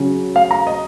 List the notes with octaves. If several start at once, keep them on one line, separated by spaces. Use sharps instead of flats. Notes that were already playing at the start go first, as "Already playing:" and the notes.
Already playing: C#3 F#3 C#4
F5
A#5
D#5